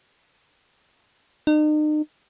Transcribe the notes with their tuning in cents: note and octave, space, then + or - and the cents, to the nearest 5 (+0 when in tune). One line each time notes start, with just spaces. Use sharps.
D#4 -40